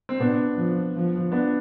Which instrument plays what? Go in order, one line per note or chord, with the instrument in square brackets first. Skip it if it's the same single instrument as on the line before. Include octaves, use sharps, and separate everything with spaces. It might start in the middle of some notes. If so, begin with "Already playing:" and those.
[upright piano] C4
[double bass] B2 [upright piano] B3 D4
[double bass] F3
F3
[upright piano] B3 D4